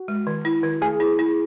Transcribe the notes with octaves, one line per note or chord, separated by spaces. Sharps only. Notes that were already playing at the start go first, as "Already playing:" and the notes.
Already playing: F#4
G#3
D#3
E4
D#3
A3 G#4
E4
E4